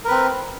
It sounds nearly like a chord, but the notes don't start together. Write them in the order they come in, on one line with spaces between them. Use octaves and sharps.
A#4 B4 C4